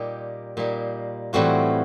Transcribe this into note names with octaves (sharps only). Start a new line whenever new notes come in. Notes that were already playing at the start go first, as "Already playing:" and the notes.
Already playing: A#2 G3 A#3 D#4 G4
A#2 G3 A#3 D#4
A2 E3 G3 C4 F4 F#4